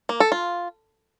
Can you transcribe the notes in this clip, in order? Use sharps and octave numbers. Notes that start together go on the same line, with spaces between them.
A#3
A4
F4